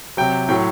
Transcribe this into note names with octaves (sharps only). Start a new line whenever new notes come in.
C3 F#3 G5
A2 F#3 G5